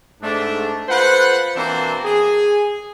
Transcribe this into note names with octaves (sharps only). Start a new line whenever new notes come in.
G#2 A3 D4
F4 A4 B4 C5 F#5
B2 E3 A#3 C4 D4 C5
G#4